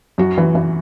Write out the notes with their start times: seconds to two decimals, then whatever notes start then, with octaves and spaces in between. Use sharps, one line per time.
0.18 F#2 F#4
0.38 E3
0.55 E3